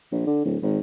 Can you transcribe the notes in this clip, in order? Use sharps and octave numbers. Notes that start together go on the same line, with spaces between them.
A#1
D3
D1
G#1